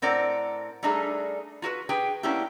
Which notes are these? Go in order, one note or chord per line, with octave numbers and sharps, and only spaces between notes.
A2 C4 A#4 D5 F#5
G3 A3 D4 D#4 G#4 A4
F4 F#4 A#4 B4
G4 G#4 B4 G5
A#3 B3 C#4 D4 E4 G4